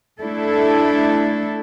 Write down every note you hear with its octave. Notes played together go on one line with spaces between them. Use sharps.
A3 D4 E4 A4